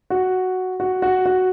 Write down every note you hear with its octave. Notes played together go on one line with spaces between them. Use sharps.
F#4
F#4
F#4
F#4